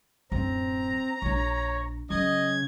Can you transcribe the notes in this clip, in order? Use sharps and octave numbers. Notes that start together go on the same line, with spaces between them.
D1 F#2 C4 A#5
A#1 D4 C#5
C#3 F#3 D#5 G#6